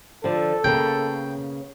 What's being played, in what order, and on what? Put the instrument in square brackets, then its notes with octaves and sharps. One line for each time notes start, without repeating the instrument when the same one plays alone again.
[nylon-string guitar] D3 F3 [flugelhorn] A4
[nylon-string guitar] C#3 A#3 B3 [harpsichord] G5